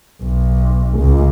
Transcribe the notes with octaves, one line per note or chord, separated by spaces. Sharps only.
B1
C#2